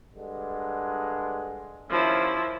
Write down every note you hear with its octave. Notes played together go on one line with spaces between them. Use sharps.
G2 D3 G#3
D#2 F3 C#4 E4